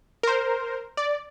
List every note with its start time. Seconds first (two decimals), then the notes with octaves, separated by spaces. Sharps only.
0.23 A#4 C5
0.97 D5